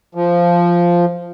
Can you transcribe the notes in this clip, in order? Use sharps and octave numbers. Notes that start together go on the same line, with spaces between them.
F3